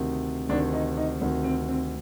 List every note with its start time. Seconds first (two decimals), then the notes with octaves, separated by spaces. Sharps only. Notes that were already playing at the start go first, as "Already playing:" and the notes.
Already playing: D2 C3 D#3
0.49 D2 C3 D#3 D4
0.73 D#4
0.97 D#4
1.21 D2 C3 D#3
1.44 C4
1.68 C4